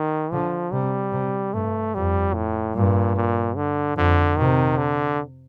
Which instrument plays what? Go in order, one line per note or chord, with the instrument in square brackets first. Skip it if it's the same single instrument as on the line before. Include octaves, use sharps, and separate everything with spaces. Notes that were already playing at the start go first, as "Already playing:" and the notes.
Already playing: [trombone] D#3
[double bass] D3 [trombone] F3
[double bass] C3 [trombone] G3
[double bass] C3
[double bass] G2 [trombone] A3
[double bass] F2 [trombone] G3
[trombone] A2
[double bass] G2 [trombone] A#2
[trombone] A#2
D3
[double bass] F2 [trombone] D3
[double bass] C3 [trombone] D#3
[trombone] D3